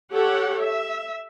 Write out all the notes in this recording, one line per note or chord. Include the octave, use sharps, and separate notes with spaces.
G4 A4 C#5 F#5
E5